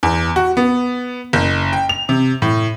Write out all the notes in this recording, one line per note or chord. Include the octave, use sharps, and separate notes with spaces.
E2
F#4
B3
F#1
G5
F7
C3
A2